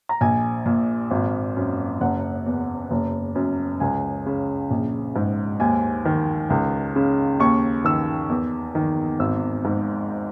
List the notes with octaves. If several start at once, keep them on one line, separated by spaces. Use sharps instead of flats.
A#5
A#1 G#5
A#2
G#1
F#2
F#1 F#5
E2
F#1
F#2
C#2 G#5
C#3
A#1
G#2
D#2 G#5
D#3
C#2
C#3
D#2 C#6
D#3 E6
E2
D#3
G#1 E6
G#2